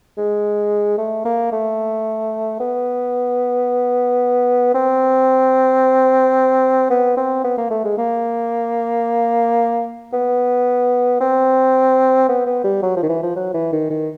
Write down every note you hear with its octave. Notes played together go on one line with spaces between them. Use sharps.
G#3
A3
A#3
A3
B3
C4
B3
C4
B3
A#3
A3
G#3
A#3
B3
C4
B3
B3
G3
F#3
F3
D#3
E3
F3
F#3
E3
D#3
D#3